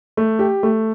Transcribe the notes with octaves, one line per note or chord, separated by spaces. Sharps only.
A3
G4
A3